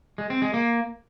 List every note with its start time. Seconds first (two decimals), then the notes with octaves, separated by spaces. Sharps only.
0.18 G#3
0.30 C4
0.42 G#3
0.54 A#3